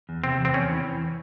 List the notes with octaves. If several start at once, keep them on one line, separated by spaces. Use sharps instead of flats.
E2
C3 C4
E2
C4
E2 C#4
E3